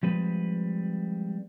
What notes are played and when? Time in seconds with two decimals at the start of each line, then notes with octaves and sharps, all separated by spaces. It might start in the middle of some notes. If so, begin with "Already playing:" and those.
0.03 F3 G3 G#3 C4 B4